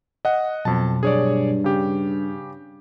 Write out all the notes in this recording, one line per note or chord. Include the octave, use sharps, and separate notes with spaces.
D#5 F#5
F2 B2 F#3 A5
G2 G#4 C#5 D5
C#3 D4 G4